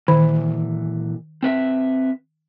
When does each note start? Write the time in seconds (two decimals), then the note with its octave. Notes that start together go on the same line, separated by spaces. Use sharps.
0.08 A#2 D#3 E3
1.43 C4 B4 E5